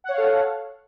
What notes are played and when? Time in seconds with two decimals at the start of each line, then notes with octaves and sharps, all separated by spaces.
0.04 F#5
0.09 C#5
0.13 F5
0.18 A4